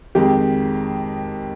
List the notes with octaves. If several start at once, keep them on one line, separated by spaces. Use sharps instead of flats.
F2 D#3 G#3 G4